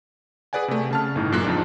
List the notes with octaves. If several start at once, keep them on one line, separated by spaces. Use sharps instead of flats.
G#4 B4 D5 F#5 G#5
C3 A3
C#3 A5 F6
G1 A2 D#4
F#2 A#2 G#3 A#3 F#6
F2 G#2 D4